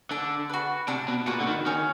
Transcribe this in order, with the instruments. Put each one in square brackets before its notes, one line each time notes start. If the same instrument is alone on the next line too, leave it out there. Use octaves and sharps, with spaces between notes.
[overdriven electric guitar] D3 [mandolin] D4
[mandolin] F#4 B4
[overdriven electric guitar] C3 [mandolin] D4
[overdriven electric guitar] B2
[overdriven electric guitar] A#2 [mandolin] F#4 B4
[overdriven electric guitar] D3
D#3
[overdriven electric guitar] D#3 [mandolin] C#4